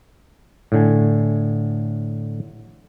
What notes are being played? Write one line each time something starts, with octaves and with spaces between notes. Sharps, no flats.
A2 D3 G#5